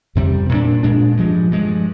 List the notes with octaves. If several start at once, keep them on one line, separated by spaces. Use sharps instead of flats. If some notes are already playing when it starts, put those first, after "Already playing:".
F2 C3 G3
A#2 G#3 D4
A#2 G#3 D4
G2 F3 G#3
G2 F3 G#3